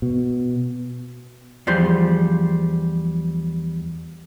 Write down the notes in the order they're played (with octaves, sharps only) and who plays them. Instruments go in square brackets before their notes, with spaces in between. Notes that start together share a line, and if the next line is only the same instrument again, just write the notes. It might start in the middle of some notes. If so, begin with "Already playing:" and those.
[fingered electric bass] B2
[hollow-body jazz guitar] E2 F3 G3 C5